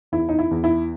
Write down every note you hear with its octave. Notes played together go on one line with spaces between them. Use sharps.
E2 E4
D#4
E4
E2
E4